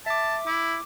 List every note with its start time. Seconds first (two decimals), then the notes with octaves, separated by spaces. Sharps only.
0.06 E5 A5 D6
0.47 E4 D6